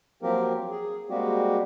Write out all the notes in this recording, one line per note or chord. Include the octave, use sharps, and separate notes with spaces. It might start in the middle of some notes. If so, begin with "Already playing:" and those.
F3 F#3 A#3 C4 G4 A#4
G#4
G3 G#3 A#3 C4 F#4 G4